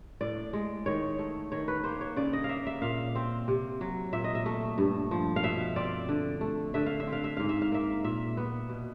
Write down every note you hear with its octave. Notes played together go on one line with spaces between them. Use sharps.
A2 D5
G#3
D#3 C#5
A3
D#3 C#5
B4
A#3 C5
C#5
C#3 D5
D#5
F5
A#3 E5
E5
A#2 F5
C4
C3
F#3
A#2 E5
D#5
E5
A3
G2
F3
F5
B2 E5
C4 D5
D3
A3
D3 E5
F5
E5
C4
F5
E5
G#2 F5
E5
F5
A#3 E5
A#2 E5
B3
B2